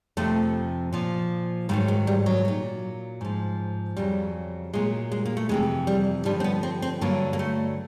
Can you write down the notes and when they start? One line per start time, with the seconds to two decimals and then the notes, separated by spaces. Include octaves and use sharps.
0.17 F2 C3 F3 A3
0.92 A#2 F3
1.69 G#2 D#3 F#3 G3
1.88 G#3
2.07 G3
2.26 F#3
2.45 A#2 F#3
3.21 G#2 F3
3.97 F2 C#3 F#3 G3
4.73 A#2 F#3 G#3
5.12 G#3
5.25 A#3
5.37 A3
5.49 F2 C3 E3 G#3
5.87 G3
6.25 G2 D3 F3 G3
6.40 C4
6.44 B3
6.63 C4
6.82 C4
7.01 G2 D3 F#3 A#3
7.33 A#3
7.39 A3